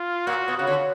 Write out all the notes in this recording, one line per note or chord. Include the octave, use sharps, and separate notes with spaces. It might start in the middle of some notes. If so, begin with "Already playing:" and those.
Already playing: F4
A#2 F#4
B2
C#3 F#4
D3